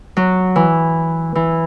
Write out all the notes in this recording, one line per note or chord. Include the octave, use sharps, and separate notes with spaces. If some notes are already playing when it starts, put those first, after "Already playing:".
F#3
E3
E3